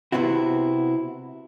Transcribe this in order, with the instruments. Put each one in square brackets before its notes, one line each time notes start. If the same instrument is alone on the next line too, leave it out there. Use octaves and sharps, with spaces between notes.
[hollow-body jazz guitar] C3 B3 C4 E4 F#4